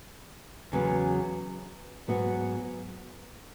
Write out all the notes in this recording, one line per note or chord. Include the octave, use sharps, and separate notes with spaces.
E2 C#3 F#3 B3
G#2 F#3 B3 F#4